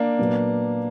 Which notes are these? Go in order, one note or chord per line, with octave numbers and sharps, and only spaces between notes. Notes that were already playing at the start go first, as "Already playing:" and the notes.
Already playing: A#3 D4
A#2 F#3 B3